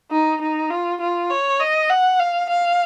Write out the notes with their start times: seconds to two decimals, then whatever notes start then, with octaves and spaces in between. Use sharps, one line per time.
0.11 D#4
0.41 D#4
0.70 F4
1.01 F4
1.30 C#5
1.60 D#5
1.90 F#5
2.20 F5
2.49 F5